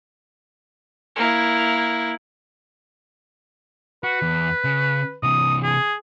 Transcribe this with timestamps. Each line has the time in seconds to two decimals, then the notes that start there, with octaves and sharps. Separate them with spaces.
1.16 A#3 E4
4.04 F#4 B4
4.22 E2
4.64 C#3
5.23 C3 E3 D#6
5.63 G#4